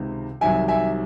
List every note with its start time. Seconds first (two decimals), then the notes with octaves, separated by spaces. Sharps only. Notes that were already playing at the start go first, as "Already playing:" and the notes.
Already playing: C#2 C3 D#3
0.41 C2 C3 D#3 F#3 E5 G#5
0.68 E5 G#5